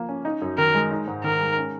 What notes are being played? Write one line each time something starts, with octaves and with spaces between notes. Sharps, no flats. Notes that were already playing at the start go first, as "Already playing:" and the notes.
Already playing: F3 A#3
C#4
D#4
F#2
D#3 A#4
G#3
D#4
G#2
D#3 A#4
G#3
C#4